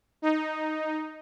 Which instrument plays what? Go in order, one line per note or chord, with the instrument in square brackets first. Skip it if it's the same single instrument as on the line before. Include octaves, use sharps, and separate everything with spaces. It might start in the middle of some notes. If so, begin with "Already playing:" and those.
[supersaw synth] D#4